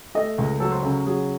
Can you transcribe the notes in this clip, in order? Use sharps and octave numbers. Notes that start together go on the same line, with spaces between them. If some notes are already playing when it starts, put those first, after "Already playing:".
A3 D#5
C#2
F#3 A4
C5
C#3 A4
F#3 G#4